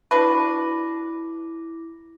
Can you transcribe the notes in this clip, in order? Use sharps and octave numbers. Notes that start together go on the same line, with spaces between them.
D4 E4 F#4 B4 D6 A#6